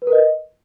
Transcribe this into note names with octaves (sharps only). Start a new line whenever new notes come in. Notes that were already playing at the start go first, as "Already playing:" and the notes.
B4
A#4
D#5